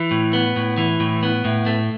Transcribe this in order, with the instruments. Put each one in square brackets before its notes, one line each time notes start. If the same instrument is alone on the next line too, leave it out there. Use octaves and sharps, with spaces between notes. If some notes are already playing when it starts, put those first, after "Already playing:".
Already playing: [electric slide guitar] E3
A2
B3
A2
E3
A2
B3
A2
A3